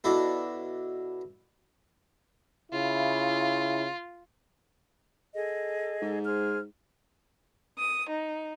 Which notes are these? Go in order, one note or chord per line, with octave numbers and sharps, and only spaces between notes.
B2 D4 E4 A4
C#3 E4 F4
G#4 A4 D#5
G#2
G#4 C5 F6
D#6
D#4